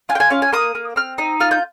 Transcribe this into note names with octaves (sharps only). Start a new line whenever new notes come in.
F4 G#5
G5
G#5
C#4 F5
G#5
A#3 D#6
A#3
C4 F6
D#4
F4 F6
G6